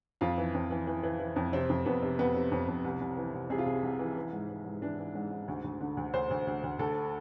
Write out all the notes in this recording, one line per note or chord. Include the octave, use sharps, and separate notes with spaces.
F2 F4
E3
F2
E3
E3
E3
E3
F2
C3 C4
F2
F2 B3
C3
F2 B3
C3
F2
F2
C2
C2
E3
C2
C3 G#4
F4
C2 G#4
C2
E3
E3
G#2
E3
G#2
E3 D4
E3
G#2
G#2
D2
D2
D3
D2
D2 C5
D2
D2
D2
D2 A4